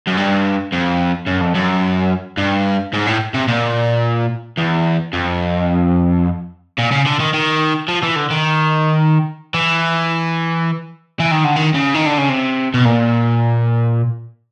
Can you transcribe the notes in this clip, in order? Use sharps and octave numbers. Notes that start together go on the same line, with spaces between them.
F#2
G2
F2
F#2
F2
F#2
G2
G#2
A2
C3
A#2
E2
F2
A#2
C#3
D3
D#3
D#3
F3
E3
D3
D#3
E3
E3
D#3
D3
D#3
C#3
D#3
D3
C#3
C3
B2
A#2